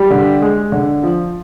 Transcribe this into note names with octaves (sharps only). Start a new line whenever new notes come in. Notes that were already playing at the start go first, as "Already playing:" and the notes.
Already playing: G3 G4
D3
G#3
D3
F3